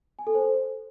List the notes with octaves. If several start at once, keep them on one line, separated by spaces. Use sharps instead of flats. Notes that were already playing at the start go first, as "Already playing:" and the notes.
G#5
A4
C5